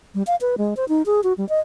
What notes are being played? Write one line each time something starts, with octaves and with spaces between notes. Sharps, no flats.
G3
F5
B4
G#3
C5
D#4
G#4
F#4
G3
D#5